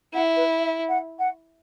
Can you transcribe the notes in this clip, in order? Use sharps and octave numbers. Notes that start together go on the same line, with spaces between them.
E4 F#5
B4
E5
F#5
F#5